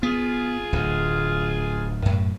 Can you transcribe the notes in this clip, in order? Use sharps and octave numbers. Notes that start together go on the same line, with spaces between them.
B3 F4 G#4
D1 D2
F#2 A2